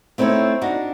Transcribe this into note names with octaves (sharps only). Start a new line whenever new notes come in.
A3 C4 D#4 E4 C#5
D4 D#4 F#4